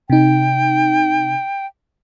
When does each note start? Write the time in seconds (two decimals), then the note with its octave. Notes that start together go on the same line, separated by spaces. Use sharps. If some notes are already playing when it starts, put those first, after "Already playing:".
0.10 C3 D#4 G5